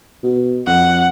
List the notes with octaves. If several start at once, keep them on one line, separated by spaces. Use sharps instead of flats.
B2
F2 F#5